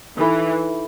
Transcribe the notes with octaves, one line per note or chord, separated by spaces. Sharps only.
E3 D#4 A4 E5 B5